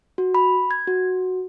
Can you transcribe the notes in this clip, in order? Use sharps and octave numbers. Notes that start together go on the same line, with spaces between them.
F#4
B5
G#6
F#4